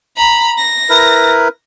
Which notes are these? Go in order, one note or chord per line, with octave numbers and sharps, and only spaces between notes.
A#5 B5
A#6
E4 A#4 B4